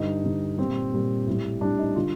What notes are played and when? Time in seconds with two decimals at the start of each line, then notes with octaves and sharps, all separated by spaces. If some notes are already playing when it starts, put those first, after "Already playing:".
Already playing: G2 D3 G3 D#4
0.24 G2 D3 G3
0.58 A#2 G3 C4
0.93 A#2 G3
1.27 A2 G3
1.61 A2 G3 D4
1.79 D#4
1.95 D3 G3 F4